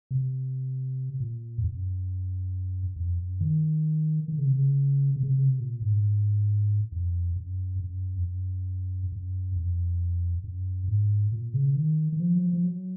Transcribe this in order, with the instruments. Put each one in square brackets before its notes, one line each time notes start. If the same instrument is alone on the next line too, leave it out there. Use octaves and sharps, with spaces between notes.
[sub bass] C3
A#2
F2
F#2
F2
F#2
D#3
D#3
C#3
C3
C#3
C3
C#3
C3
C#3
C3
A#2
G#2
F2
F#2
F#2
F2
F#2
F#2
F2
F#2
G#2
A#2
C#3
D#3
D#3
F3
F#3
F3
F3
F#3